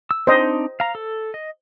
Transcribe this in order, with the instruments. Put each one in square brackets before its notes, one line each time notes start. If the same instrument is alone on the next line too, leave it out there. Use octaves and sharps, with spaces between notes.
[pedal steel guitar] E6
[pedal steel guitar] C4 D4 D#4 [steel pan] C5 D#5
[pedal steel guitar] F5 A#5
A4
D#5